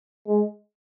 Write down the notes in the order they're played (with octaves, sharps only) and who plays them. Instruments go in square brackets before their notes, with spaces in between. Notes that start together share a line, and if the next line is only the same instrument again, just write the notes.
[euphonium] G#3